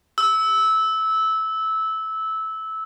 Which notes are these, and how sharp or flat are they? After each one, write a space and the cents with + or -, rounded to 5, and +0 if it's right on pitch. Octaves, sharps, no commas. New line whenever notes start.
E6 -15